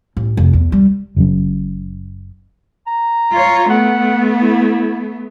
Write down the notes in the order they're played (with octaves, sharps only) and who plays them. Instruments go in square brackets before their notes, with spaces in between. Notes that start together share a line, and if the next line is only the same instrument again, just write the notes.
[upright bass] A1
F1
E2
G3
[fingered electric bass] F#1 F#2
[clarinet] A#5
[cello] F4 C#5
[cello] A3 B3 [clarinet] F#5
[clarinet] E4